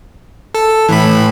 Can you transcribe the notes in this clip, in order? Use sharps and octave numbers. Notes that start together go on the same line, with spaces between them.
A4
A2 E3 B5